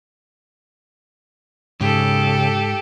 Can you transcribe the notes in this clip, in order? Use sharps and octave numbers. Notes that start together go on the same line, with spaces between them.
G#2 C#3 G4 A4